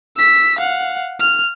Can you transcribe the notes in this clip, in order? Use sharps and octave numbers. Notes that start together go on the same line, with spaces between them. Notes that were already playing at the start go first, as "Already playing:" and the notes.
E6 B6
F5 F#5
F6